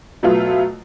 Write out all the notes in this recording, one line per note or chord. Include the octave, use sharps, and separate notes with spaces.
B2 F#3 A3 B3 F4